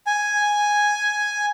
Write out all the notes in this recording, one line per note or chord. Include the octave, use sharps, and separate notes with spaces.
G#5